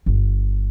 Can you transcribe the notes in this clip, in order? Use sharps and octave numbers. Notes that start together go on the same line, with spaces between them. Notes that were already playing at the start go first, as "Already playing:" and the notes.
G1